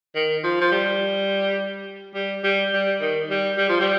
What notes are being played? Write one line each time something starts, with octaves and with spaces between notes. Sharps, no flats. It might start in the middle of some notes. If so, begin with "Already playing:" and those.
D#3
F3
F3
G3
G3
G3
G3
D#3
G3
G3
F3
G3